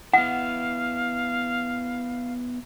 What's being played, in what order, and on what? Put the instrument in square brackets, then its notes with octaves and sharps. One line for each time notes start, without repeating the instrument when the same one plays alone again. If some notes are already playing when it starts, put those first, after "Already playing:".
[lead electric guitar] B3 E4 [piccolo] F5 [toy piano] F#5